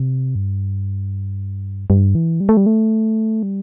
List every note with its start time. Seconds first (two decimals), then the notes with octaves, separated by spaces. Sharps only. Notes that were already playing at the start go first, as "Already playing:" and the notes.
Already playing: C3
0.35 G2
1.90 G2
2.15 E3
2.40 G3
2.49 A3
2.57 G3
2.66 A3
3.43 G3